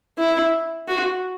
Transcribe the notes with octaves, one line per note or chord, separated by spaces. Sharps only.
E4
F#4